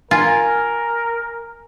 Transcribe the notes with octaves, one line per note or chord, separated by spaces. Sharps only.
F4 A#4 G#5